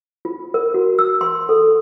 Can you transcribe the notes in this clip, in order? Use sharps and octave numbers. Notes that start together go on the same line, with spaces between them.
F4
A#4
F#4
E6
C6
A4